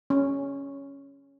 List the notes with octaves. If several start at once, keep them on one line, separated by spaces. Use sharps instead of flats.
C#4